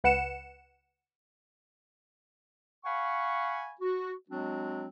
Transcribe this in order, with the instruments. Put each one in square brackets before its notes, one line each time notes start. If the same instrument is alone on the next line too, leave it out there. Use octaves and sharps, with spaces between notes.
[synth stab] C#2 B4 F#5 C#7 E7
[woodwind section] F5 F#5 G#5 B5 C#6
F#4
F#3 G#3 C4 D4 F#4